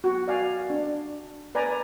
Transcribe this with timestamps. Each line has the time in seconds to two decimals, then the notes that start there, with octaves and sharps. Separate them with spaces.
0.04 F#4
0.28 D5 F5 G#5
0.70 D4
1.55 B4 D5 G#5 A#5